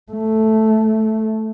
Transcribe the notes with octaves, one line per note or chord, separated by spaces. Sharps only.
A3